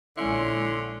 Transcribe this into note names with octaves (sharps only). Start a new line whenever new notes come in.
A#1 D3 G#3 C#4 E4 C6